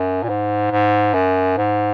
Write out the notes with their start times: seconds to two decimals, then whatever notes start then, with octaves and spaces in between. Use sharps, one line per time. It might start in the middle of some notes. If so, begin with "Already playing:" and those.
Already playing: F#2
0.24 A#2
0.29 G#2
0.71 G#2
1.14 F#2
1.58 G#2